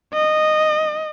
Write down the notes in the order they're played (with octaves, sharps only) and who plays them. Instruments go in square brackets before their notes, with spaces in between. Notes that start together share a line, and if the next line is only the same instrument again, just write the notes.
[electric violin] D#5